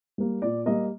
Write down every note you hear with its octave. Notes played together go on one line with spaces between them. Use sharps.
G3 A#3
A#2 D5
G3 A#3 D#5